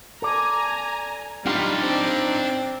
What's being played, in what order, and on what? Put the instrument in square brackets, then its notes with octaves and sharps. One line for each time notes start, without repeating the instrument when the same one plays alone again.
[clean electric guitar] A4 D5 [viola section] G#5 A#5
[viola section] G3 [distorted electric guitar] D4 F5 [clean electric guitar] D#4 F4
[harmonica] C4 [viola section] D5